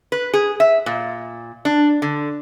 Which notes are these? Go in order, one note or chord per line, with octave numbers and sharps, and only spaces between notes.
B4
G#4
E5
A#2
D4
D3